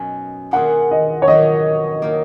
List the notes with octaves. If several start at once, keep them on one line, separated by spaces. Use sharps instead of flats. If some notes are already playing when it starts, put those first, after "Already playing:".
Already playing: F#2 B2 F#3 C#4 D#4 F#4
B2 A#3 F4 G#4 F#5
D#5
C#5
B2 F#3 A#3 D#4 D#5
D#3 A#3